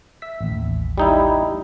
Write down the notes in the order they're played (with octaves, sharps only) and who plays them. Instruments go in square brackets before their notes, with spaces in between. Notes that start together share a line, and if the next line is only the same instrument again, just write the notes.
[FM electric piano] E5 B6
A1 D#2
[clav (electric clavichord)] G3 D#4 E4